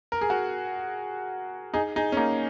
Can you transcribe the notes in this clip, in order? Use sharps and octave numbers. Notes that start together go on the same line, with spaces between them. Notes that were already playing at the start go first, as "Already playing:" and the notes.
A#4
G#4
F#4 A#4
D#4 G#4
D#4 G#4
C#4
A#3 D#4